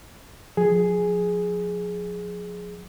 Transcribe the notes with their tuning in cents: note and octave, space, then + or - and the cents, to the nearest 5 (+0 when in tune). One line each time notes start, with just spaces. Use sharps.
F3 +35 G#4 +5